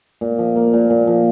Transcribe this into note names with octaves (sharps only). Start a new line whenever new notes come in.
A#2
F3
A#3
A#2
A#2
F3